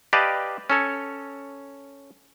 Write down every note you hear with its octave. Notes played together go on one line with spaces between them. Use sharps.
G4 B4 D5 D#5 F5 A5
C#4 A4 C#5